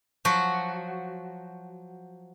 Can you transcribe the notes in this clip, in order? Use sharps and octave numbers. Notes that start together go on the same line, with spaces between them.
F3 F#3 F#4